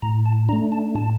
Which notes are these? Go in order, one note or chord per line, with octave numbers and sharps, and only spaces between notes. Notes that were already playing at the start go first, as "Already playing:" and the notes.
A2 A#5
A5
A3 D4 A#5
A5
A2 A5